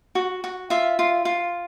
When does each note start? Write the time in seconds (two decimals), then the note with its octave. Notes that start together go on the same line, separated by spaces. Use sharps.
0.15 F#4
0.44 F#4
0.70 F4 E5
0.99 F4
1.25 F4